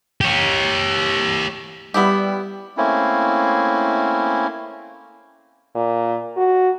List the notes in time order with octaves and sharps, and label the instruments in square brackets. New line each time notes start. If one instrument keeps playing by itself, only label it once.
[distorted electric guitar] G4 C#5
[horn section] G3 [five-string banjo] B3 E4 G4
[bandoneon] A3 A#3 C4 C#4 E4
[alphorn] A#2
F#4